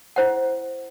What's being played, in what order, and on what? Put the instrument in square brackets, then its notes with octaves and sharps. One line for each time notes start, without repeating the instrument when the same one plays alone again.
[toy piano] E4 C5 F#5